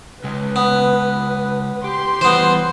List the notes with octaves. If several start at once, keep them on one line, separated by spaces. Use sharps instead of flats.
C#3 G#3 B4
B3
G4 C6
E3 G3 B3 C5